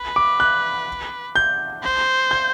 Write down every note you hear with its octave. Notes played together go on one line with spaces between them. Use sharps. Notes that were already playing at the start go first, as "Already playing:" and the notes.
Already playing: B4
D6
F#6
G6
C5
G6